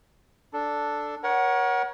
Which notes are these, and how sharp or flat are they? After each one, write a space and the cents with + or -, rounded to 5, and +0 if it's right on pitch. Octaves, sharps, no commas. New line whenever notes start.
D4 +0 A4 +0
A#4 +35 C#5 +0 F#5 +10